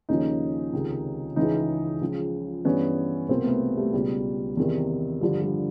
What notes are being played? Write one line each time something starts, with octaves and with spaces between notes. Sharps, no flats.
D#2 C#3 F3 C#4 D#4
C#2 C3 D#3
C#2 C#3 E3 C#4 D#4
C#2 C#3 F3
G2 E3 B3 C#4
C2 B2 A#3 C4
A3 B3
G3 A3
C#2 B2 G3
E2 C3 D#3
G2 D3 F3 G3
G3